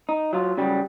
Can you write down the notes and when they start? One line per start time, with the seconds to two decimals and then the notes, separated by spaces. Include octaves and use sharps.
0.09 D#4
0.33 F#3 F4
0.57 C#3 F#3 G3